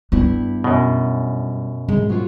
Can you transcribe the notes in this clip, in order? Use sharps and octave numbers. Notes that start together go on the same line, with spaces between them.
G2 B3 D4 E4
F#2 B2
G#2 G#3
F#3 A#3 F4